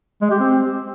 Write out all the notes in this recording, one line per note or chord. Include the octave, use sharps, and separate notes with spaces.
G#3
G4
C4